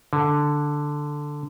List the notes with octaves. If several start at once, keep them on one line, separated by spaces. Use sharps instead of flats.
D3